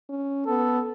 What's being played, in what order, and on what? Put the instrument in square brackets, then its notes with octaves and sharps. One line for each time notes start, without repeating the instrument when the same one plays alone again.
[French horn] C#4
[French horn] B3 [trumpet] A4